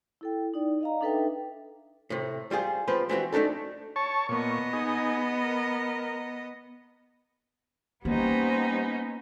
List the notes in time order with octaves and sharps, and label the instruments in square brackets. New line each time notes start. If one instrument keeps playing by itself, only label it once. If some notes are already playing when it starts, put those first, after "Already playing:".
[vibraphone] E4 A4 G5
D#4 D5
D#5 F5 A#5
D4 D#4 A4 B4 E5 G5
[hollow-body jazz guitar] A2 C3
G3 F4 G#4 C5
F3 C4 B4 C5
E3 C4 F#4 G4
D2 A3 D4 D#4 A4
[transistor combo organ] C#5 A5 C#6
[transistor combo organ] A#2 C#6 [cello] B3 D#5
[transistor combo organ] D#4 G#4
A#4
[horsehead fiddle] G3 C5 [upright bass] A#3 [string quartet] B3 C#4 D#4